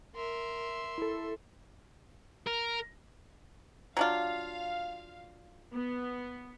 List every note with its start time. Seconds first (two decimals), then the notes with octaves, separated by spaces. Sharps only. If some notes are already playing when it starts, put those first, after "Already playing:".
0.15 A#4 E5 C6
0.98 E4 A4
2.46 A#4
3.97 F#3 D4 F4 F5
5.74 B3